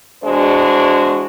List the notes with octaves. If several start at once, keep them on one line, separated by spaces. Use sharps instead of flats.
E2 G#3 D4 F#4 C5